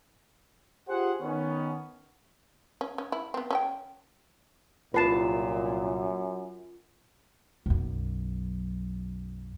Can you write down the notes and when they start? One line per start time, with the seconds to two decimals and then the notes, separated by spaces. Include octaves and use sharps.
0.88 F4 G4 G#4 C5 F#5
1.20 D#3 B3 C#4
2.81 C#4
2.98 C#4
3.12 E4
3.34 B3 C4
3.51 C#4 A4 G5
4.94 C2 F#2 A#2 F4 B4 A5 C7 E7
7.66 B1 F#2